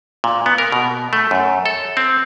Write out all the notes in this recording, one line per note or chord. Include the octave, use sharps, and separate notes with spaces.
A#2
B3
A#4
B2
A3
F#2
A4
C4